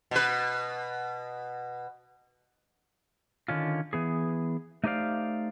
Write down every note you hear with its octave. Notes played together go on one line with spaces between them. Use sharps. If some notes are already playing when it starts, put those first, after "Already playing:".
B2 B4
D3 D#3 C#4 F4
E3 B3 G#4
A3 D#4 G4 C5 D5 F5